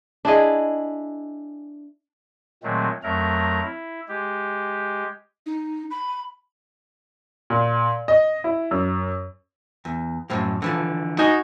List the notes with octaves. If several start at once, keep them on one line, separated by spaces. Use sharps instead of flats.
D4 E4 G#4 D#5
A#2 D#3 F#3 G#3 A3 C4
F2 F#3 A3 A#4 A#5
E4
G#3 G4
D#4
B5
A#2
D#5
E4
F#2
E2
F#2 A2 F3
D3 E3 F3
D#4 F#4 G#5